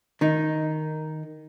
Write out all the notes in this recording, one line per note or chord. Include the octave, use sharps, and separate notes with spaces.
D#3 D#4